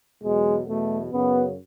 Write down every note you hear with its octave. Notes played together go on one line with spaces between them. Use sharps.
E2 B2 F#3 G#3
E2 B2 F#3 A3
F#2 C#3 F#3 B3